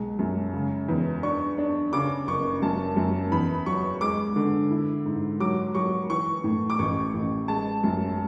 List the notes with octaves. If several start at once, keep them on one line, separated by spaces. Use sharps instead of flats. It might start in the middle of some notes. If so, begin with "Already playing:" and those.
Already playing: B1 G#3
F#2
C#3
E2
D4 C#6
D4
C#3 D6
F#1 C#6
F#2 A5
F#2
E2 B5
F#3 C#6
G#3 D6
D3
E4
G#2
F#3 D6
F#3 C#6
E3 C#6
A2
D6
A1 C#6
A1
G#3 A5
F#2